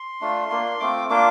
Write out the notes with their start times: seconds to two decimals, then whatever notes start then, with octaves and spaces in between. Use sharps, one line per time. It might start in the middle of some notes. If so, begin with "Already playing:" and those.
Already playing: C6
0.21 A3 D4 F4
0.50 A#3 D4 F4
0.80 A3 C4 F4 D6
1.10 A#3 D4 F4 D6